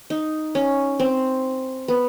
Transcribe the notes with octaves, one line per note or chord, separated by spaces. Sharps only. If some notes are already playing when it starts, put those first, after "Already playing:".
D#4
C#4
C4
B3